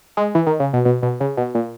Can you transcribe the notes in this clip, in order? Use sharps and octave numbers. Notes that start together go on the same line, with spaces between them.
G#3
E3
D#3
C#3
B2
B2
B2
C#3
B2
A#2